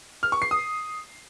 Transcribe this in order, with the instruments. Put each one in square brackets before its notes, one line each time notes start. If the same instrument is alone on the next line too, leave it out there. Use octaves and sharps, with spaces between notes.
[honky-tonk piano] F6
C#6
C7
D#6